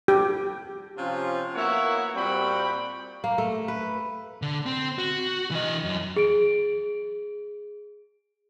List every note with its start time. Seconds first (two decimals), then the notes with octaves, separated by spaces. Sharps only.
0.08 G4
0.97 C3 F3 C#4 F4
1.55 E3 A#3 B3 E4 F#4 C#5
2.15 A#2 G3 C4 F#4 G5 B5
3.24 A#3
3.38 A3
3.68 B4
4.42 D3
4.66 C4
4.98 F#4
5.51 E3 D#5
5.84 F#2
6.16 G#4 D7